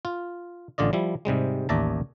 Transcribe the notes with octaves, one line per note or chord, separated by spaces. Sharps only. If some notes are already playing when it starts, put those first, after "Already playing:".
F4
A1 D3 F4 D5 D#5
F3 G3 E4
G#2 C3 G3 G#3
A1 D#2 D5 E5 A5 A#5